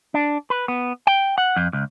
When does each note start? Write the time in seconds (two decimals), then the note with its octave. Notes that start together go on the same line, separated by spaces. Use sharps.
0.14 D4
0.50 B4
0.68 B3
1.07 G5
1.38 F#5
1.56 F2
1.73 C#2